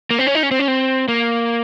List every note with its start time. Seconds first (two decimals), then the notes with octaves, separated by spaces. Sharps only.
0.11 A#3
0.19 C4
0.27 C#4
0.35 D#4
0.43 C#4
0.51 C4
0.59 C#4
0.68 C4
1.08 A#3